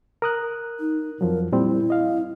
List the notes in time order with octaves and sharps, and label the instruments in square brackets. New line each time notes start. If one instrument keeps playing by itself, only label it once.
[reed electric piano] A#4 D#6 F#6
[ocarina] D#4
[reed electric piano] F2 F3 F#3 [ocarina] A#4
[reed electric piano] A#2 G3 C4 [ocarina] E4
[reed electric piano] D#5 F5